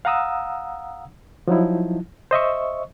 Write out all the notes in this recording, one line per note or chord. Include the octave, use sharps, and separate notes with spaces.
F5 F#5 A#5 D#6 E6
F3 F#3 D#4 E4
C5 D#5 E5 C#6